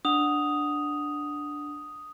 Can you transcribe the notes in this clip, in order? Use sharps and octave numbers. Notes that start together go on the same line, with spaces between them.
D4 F#5 D#6 F7